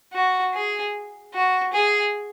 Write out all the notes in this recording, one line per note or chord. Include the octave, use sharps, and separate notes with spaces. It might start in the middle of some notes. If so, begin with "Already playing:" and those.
F#4
G#4
F#4
G#4